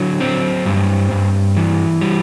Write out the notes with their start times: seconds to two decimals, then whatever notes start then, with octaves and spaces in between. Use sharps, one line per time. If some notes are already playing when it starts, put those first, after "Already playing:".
Already playing: D3 F#3
0.20 C4
0.66 G2
1.11 G2
1.57 E3
2.01 G3